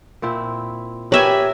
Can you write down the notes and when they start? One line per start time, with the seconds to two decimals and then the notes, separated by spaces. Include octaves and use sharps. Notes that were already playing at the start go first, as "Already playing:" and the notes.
0.22 A#2 C4 E4
1.12 G4 A#4 B4 C#5 E5 G#5